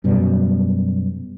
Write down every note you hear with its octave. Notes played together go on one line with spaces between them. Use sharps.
F#2 B2 G3